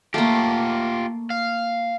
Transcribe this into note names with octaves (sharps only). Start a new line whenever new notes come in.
A3 A#3 F4 G4
F5